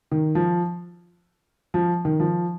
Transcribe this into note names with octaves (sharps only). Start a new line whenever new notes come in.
D#3
F3
F3
D#3
F3